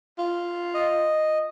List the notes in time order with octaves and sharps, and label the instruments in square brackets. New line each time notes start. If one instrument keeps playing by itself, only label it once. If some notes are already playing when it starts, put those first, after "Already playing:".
[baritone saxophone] F4
[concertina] D#5